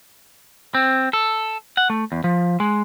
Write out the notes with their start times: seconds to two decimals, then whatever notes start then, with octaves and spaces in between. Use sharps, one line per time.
0.75 C4
1.13 A4
1.77 F#5
1.90 A3
2.12 E2
2.24 F3
2.60 G#3